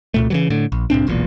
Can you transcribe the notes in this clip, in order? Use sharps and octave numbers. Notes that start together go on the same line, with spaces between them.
C2 A#2 A3
C#3 E3 F#3
A2 D3
A#1
C2 A2 C4 D4
E1 B1 E2 A#2